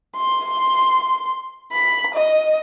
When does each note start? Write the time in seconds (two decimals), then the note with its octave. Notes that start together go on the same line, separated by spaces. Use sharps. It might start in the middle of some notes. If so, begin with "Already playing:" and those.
0.17 C6
1.72 B5
2.14 D#5